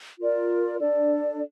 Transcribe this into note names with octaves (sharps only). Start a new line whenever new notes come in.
F4 A#4 D5
D4 A4 D5